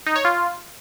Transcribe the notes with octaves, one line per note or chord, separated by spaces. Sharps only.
D#4
C#5
F4